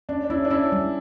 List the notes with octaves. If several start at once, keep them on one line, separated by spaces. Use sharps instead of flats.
C#4 D4
D4
C#4 E4
D4
C#4 E4
G3